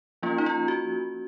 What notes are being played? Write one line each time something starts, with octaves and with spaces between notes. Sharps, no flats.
F3 A#3 C#4 F4
D#4
F4
F#4